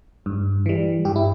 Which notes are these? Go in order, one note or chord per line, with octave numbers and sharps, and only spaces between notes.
G2
E3 G3
G2 G4
E4